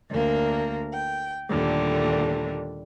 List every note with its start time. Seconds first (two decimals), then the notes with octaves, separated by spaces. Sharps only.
0.11 D2 A#3 A#4
0.93 G5
1.49 D#2 A#2 D3 G3 A3